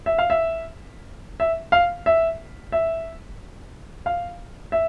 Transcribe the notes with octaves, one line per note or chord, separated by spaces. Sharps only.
E5
F5
E5
E5
F5
E5
E5
F5
E5